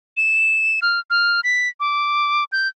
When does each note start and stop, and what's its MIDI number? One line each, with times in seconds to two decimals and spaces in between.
0.17 0.80 100
0.82 1.00 89
1.10 1.41 89
1.44 1.69 95
1.80 2.44 86
2.52 2.68 91